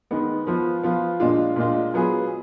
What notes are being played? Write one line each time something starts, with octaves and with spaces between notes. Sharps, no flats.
D#3 G#3 B3
F3 B3 F4
F3 B3 F4
A#2 G#3 D4 F4
A#2 G#3 D4 F4
F#3 B3 F4 G#4 B4